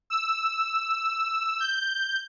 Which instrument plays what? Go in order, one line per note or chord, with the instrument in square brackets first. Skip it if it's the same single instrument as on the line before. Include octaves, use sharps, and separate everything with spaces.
[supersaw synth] E6
G6